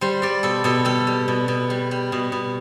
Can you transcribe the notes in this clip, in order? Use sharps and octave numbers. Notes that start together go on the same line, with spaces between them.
G3 C5
G3 D5
B2 A4
B2 A4
G3 A4
G3
B2
B2
G3
G3
B2
B2